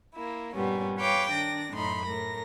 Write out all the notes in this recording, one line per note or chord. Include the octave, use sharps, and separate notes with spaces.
A#3 E4
G2 A#2 G3 B3 C#4
B4 C#5 F5 G5 D6
D#3 D4 D5 A#6
F#2 A2 D#4 B5 C6
A2 A#4 A#6